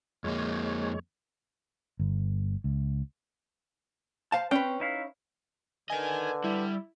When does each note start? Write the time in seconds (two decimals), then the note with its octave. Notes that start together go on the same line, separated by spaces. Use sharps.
0.24 F2 G#3 A#3 C#5
1.99 G1
2.64 C#2
4.32 C5 F5 A5
4.51 C4 C#4 B4 G5
4.80 D#4 E4 F5
5.90 D3 A#4 B4 D#5 G#5
6.44 G3 E4